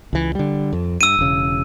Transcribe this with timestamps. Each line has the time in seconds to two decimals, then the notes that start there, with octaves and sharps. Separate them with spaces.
0.13 C#2 E3
0.35 D3 G3
0.73 F2
1.01 G2 E6 D#7
1.19 E1 C#3